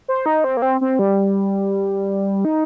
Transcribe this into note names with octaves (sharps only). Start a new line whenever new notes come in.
C5
D#4
C4
A#3
C4
C4
G3
D#4